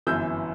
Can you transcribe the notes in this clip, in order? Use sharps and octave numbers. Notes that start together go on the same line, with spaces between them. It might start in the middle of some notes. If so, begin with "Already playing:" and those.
G1 F#2 E3 E6 G6